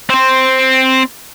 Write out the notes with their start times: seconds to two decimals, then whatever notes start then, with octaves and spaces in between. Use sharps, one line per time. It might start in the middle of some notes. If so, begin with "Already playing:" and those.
0.10 C4 C5